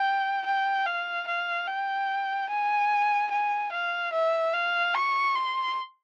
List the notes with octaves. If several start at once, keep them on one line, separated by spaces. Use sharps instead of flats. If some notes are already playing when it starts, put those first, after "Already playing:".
Already playing: G5
G5
F5
F5
G5
G#5
G#5
F5
E5
F5
C#6
C6